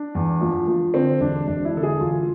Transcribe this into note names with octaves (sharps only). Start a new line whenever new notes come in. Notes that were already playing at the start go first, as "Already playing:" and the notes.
Already playing: D4
E2
F3
F3
D3 C4
E1 D4
E1 D4
E4
D3 A4
G#4
E1 F4